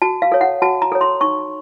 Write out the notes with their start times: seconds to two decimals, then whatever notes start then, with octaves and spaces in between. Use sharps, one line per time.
0.02 F#4 A5
0.22 F5
0.32 A4 C#5
0.41 F#5
0.62 F#4 A5
0.82 A#5
0.92 A4 C#5
1.01 C6
1.21 D#4 C#6